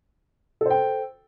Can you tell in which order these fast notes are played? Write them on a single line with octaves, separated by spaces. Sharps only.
A4 C5 G5